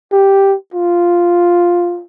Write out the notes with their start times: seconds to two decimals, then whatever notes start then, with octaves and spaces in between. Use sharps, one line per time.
0.12 G4
0.74 F4